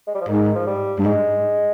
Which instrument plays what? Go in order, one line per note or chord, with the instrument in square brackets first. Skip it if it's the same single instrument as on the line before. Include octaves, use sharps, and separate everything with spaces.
[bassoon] G#3
G3
F3
[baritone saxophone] G#2 [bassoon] D#3
[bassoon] F3
G3
[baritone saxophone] G2
[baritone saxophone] G#2 [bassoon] G#3